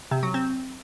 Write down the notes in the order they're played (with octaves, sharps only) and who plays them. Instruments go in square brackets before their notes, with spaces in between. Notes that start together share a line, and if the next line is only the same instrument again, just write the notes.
[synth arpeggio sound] C3
F#3
C4